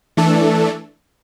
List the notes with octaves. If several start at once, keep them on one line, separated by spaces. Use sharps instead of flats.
E3 A3 D4 A4